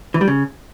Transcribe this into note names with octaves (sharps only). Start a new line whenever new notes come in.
E3
G3
C#3